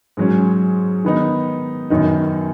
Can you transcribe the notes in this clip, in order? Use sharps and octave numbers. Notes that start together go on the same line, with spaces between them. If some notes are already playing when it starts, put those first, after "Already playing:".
G#2 F#3 C#4
D#3 B3 D#4
F#2 D#3 F#3 B3 D#4